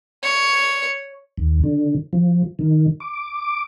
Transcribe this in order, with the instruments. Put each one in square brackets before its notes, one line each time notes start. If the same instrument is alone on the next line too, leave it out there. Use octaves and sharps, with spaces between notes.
[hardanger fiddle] C#5
[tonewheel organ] D#2
D3
F3
D#3
D6